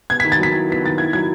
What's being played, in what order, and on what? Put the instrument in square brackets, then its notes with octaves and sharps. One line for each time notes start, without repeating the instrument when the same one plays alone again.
[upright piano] B3 [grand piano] G#6
[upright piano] D#3 [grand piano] B6
[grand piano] A6
[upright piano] F#3 [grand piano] B6
[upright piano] E4
[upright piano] B3 [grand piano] B6
[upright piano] D#3 [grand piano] A6
[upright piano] E4 [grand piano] G#6
[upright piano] F#3 [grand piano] G#6